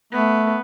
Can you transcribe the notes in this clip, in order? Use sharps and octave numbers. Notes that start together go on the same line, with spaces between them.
A3 B3